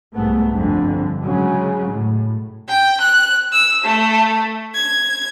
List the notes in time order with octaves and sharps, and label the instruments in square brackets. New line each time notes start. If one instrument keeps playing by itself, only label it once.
[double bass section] C2 G#2 A3 B3
G1 F2 D3
C#3 F#3 G#3
A2
[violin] G5
F#6
E6
A3
G#6